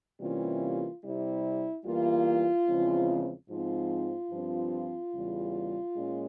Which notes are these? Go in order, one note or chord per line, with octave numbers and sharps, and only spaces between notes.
C3 E3 G3 A#3 C#4 F4
C3 G3 C4 E4
E2 E3 G3 A#3 F4
E2 C#3 F3 G#3 C4
G#2 F3 C4 F4
G2 F3 C4
E2 C#3 G3
A#2 G#3 C#4